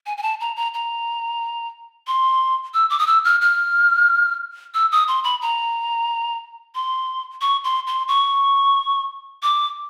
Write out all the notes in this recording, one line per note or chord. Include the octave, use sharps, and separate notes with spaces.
G#5
G#5
A5
A#5
A#5
A#5
C6
E6
D6
D#6
E6
F6
F6
E6
D#6
C6
B5
A#5
C6
C#6
C6
C6
C#6
D6